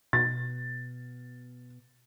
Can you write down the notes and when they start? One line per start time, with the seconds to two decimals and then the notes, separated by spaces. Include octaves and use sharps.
0.13 B2 A6